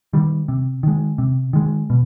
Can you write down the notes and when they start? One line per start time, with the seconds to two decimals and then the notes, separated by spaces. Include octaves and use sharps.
0.13 D#3 G3
0.48 C3
0.83 D#3 G#3
1.18 C3
1.53 D#3 G#3
1.90 B2